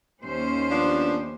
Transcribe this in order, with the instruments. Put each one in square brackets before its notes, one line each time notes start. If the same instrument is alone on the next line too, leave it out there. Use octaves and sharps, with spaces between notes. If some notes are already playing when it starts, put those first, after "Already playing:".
[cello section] D#2 C#4 C5
[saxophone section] F3 B3 D4